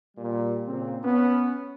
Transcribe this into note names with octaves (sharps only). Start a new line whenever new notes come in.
A#2 G3
A#2 C#3 C4
B3 C#4